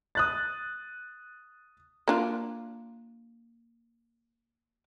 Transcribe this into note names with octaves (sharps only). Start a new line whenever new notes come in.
D#6 F#6 A6
A#3 D4 F4